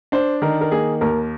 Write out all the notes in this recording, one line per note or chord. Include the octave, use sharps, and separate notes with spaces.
D4 C5
D#3 A#4
A#4
A#3 G#4
D#2 A#4